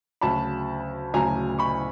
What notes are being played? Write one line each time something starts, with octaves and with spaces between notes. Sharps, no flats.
D2 C#3 F#3 A5 B5
D2 C#3 F#3 G#5 A#5
B5 C#6